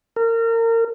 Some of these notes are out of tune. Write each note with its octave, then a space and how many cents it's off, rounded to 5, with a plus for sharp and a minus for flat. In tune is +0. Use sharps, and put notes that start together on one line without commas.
A#4 -30